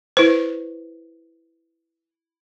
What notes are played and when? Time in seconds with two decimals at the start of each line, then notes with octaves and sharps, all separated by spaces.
0.17 E4 B4 C5